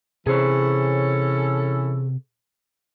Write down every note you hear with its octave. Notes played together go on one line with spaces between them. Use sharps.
C3 E3 C#4 G#4 A4 C5 C#5